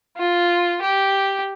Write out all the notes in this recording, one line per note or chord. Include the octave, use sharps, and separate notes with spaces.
F4
G4